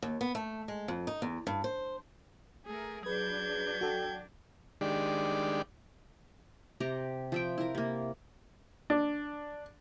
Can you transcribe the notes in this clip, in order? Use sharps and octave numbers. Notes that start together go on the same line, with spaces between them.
D#2
B3
A3
G#3
F2
D#4
E2
G2
C5
A3 G#4 A#4
F#3 D4 G#4 B4 G6 G#6
F#4 A4 G5
D#3 G#3 D4 G4 D5
C3 G4 A#5
F3 E5 G5
E4 A#4
C3 A#3
D4